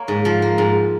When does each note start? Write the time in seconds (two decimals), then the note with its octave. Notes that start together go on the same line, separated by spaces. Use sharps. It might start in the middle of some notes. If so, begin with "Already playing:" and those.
Already playing: A#3 C#5
0.08 G#2
0.25 F3
0.42 A#3
0.58 G#2